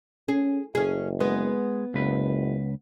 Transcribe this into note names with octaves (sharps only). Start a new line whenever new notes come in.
C#4 G#4
F#1 C#4 G#4
G#3 B3
F#1 C#2 B4